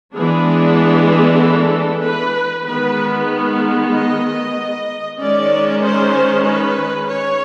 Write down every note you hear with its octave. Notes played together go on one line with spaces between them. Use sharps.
E3 G#3 B3 D4 G#4
A4
B4
D#3 G#3 B3 B4
D#5
D#3 G#3 C#4 D5
C5
B4
C#5